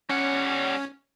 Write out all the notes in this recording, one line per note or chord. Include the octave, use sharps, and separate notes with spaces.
G3 C#4 F#5